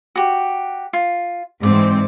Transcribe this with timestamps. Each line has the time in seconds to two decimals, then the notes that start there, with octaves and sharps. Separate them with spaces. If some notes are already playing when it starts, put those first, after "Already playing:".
0.15 F#4 G4
0.93 F4
1.63 G#2 E3 C4 D5